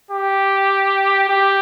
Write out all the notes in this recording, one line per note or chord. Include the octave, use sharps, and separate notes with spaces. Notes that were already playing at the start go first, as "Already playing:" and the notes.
G4
G4